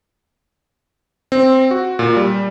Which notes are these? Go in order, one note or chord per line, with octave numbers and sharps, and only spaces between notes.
C4
F#4
A#2
G3